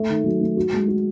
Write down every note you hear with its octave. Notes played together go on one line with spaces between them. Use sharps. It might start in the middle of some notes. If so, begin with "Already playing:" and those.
Already playing: A3
D#3
F#3
A3
F#4
G#3
F#4